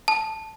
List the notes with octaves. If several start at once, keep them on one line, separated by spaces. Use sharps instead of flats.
A5